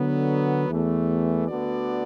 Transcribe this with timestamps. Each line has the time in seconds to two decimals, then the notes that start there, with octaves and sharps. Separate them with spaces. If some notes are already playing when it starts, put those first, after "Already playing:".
Already playing: D3 F#3 B3
0.69 E2 E3 A3
1.47 D2 D3 B3 F#4 D5